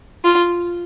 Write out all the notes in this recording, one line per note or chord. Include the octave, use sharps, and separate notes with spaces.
F4